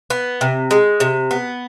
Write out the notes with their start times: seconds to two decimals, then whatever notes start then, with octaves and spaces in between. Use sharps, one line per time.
0.10 B3
0.41 C3
0.71 G#3
1.00 C3
1.31 B3